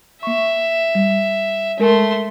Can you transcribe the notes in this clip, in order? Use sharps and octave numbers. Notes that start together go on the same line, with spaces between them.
A#3 E5 C#6
G3
G#3 A3 A4 A#4 C6